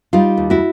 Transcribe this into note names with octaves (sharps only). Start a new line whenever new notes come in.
G3 D#4 F4
D#2
E4 F#4